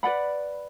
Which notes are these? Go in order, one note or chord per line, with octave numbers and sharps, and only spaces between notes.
B4 D5 F#5 B5